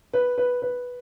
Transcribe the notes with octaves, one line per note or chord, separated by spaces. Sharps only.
B4
B4
B4